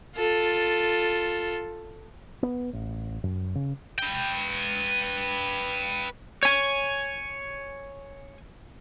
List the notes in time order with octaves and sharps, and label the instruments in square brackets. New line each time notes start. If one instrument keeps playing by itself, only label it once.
[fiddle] F4 A4
[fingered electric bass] B3
A1
F#2
C#3
[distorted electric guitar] B4 G5
[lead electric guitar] C#5 G#5